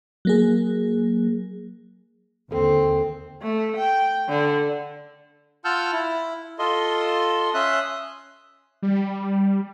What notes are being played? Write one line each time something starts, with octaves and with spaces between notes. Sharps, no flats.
F#3 A#3 G#4
D#2 D3 C4 A4
A3
G5
D3
F4 F#5 A5 E6 F6 G6
E4
F4 A4 D#5 C6
C#4 E5 C6 D#6 F#6
G3